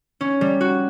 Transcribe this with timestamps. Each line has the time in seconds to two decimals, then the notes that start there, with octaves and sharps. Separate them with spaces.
0.21 C#4
0.41 G3
0.61 F#4